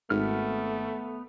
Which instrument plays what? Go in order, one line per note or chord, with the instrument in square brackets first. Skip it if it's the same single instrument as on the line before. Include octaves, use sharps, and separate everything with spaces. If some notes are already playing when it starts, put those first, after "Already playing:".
[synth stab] G#1 [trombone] A3 [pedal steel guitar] B3 F6